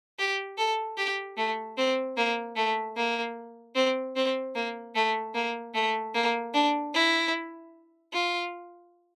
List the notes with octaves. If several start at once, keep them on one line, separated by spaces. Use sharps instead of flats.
G4
A4
G4
A3
C4
A#3
A3
A#3
C4
C4
A#3
A3
A#3
A3
A#3
D4
E4
F4